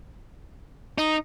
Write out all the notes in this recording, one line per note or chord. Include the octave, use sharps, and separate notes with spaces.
D#4